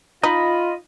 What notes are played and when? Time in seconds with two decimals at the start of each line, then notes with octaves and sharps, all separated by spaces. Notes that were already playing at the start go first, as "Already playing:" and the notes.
0.23 D#4 F4 D#5 B5